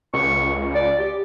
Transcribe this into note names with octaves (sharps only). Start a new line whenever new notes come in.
C#2 C#6
D5
G4